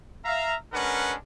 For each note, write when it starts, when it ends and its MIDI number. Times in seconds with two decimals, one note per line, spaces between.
0.25 0.56 76
0.25 0.56 77
0.25 0.56 82
0.73 1.14 56
0.73 1.14 61
0.73 1.14 62
0.73 1.14 70
0.73 1.14 71
0.73 1.14 78